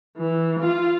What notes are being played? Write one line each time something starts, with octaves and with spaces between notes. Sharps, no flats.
E3
F4